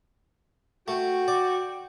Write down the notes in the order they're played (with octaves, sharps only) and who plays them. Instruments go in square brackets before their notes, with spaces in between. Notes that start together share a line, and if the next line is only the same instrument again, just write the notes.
[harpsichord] A3 [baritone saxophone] F#4 [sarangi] G5
[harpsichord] D5